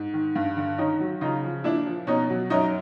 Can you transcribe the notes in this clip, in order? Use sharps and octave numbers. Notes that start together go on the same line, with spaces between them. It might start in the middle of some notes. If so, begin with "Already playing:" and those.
Already playing: G#2
D#3
G2
D3
D#3 C#4 D#4
F#3
C#3 D#4 F4
F3
A#2 D4 E4
F3
B2 C#4 D#4
F#3
F#2 C#4 D#4